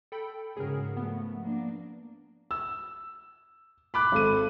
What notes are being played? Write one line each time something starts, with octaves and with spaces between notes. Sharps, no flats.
A4 G5 B5
G#2 C#3 F#4 G#4 A#4
F3 A3 B3
A#3 D4
E6
B5 D6 F#6
G#1 A4 D#7